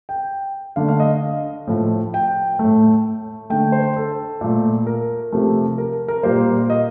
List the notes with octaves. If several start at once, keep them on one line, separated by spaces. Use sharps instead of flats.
G5
D3 A3 F5
F5
D#5
A2 F3 A3
G5
A2 A3
D3 A3 G5
C5
A4
A#2 A3
A#4
C3 F3 A3
A#4
A#4
A#2 G3 A#3 C5
D#5